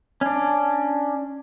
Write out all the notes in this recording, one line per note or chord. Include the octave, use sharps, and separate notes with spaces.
C#4 D4